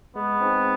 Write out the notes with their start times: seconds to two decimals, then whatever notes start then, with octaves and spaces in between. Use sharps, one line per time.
0.16 G#3 B3
0.41 C4 D#4 G#4